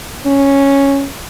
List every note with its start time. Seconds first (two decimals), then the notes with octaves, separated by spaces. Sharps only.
0.26 C#4